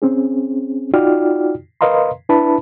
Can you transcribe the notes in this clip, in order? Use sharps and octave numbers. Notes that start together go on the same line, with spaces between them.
C4 C#4 G#4
D#4 F4 F#4 D5 G5 F6
A#4 B4 D#5 F5 A#5 C6
D4 E4 B4 E5 A5 B5